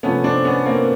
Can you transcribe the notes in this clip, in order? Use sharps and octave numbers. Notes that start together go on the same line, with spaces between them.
C3 F3 A3 B3 C#4
C4 D4
B3 C#4
A#3 C4